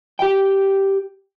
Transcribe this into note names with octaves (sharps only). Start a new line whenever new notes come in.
G4 G5